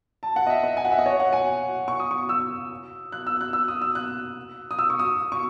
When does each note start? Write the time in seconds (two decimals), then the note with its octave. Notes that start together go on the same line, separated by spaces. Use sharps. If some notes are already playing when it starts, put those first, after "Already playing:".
0.23 A5
0.36 F#5
0.47 D#5
0.50 E5
0.64 D#5
0.77 G#5
0.85 F#5
0.92 E5
0.99 D#5
1.06 C#5
1.20 F#5
1.33 G#5
1.88 C#6
2.00 D#6
2.11 C#6
2.29 E6
3.12 F#6
3.27 E6
3.41 F#6
3.53 E6
3.68 D#6
3.82 E6
3.95 F#6
4.71 D#6
4.79 E6
4.90 C#6
4.99 D#6
5.32 C#6